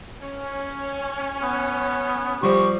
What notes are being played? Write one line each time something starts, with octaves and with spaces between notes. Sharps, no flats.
C#4
B3
F3 G3 G4 C#6